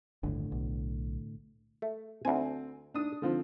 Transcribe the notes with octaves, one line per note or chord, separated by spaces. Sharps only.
G1 D#2 A2 D3
B1
A3
D2 C4 G#5
D4 D#6
D3 F3 C4